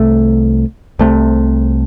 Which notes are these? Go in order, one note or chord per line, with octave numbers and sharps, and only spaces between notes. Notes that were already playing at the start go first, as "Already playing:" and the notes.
Already playing: C2 C3 A3
C2 C3 A3